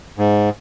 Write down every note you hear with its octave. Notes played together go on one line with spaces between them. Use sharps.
G#2